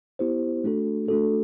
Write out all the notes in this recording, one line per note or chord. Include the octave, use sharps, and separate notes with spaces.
B3 E4 G4 C5
A3 D4 F#4 A4
A3 D4 F#4 A4